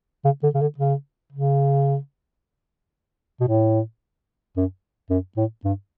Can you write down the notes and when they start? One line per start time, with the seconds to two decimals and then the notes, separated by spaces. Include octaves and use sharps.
0.25 C#3
0.43 D3
0.54 C#3
0.61 D3
0.78 C#3
1.32 C#3
3.40 B2
3.48 A2
4.56 F#2
5.10 F#2
5.36 A2
5.64 G2